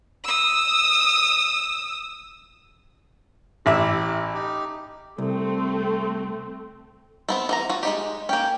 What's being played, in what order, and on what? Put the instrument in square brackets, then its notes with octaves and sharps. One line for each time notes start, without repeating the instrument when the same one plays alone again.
[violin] D#6 E6
[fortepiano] A1 E5 [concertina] E4 G4
[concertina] D#4 G4
[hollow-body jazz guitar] C2 [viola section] A3 C4
[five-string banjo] A3 B3 C4
E3 B3 A#5
F4 F#4
G#3 D#4 G4
[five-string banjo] A#3 C#4 [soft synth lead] G5